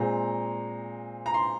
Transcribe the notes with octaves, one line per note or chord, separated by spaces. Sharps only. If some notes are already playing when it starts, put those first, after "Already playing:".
Already playing: A#2 G#3 C4 A#5
A#5
C6